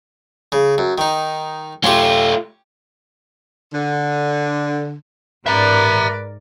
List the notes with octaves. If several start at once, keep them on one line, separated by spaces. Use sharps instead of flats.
C#3
F#2
D#3 D#4
A3 C#4 F4 G4
D3
G#2 A#4 B4 D5 E5 A#5